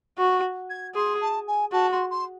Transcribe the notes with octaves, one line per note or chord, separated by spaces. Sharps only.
F#4 C#6
G#6
G#4 C6
A5
G#5
F#4 A5
C6
C6